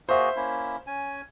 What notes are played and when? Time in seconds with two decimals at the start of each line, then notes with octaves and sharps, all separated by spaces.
0.09 A#3 F#4 G#4 C5 E5
0.36 A#3 C#4 E4
0.87 C#4 G#5